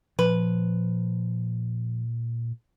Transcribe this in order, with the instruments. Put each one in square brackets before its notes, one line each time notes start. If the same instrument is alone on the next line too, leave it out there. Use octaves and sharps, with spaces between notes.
[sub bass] A#2 [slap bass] F3 [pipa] B4